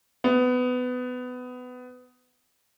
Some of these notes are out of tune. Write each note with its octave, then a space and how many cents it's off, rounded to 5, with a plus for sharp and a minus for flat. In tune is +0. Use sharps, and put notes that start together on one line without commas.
B3 +20